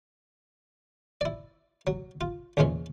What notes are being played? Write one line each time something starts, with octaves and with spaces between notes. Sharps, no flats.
E4 D5
F#3
F4
A#1 E2 E3 G#3 C#4 G#4